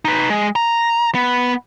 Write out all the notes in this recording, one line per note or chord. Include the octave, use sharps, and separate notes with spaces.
D#4 B4
G#3
A#5
B3